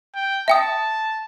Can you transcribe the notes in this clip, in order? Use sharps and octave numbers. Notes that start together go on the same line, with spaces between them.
G5
E5 G5 A5 D#6